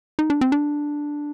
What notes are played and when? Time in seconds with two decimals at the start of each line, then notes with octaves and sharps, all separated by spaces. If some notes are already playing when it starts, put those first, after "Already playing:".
0.19 D#4
0.30 D4
0.41 C4
0.52 D4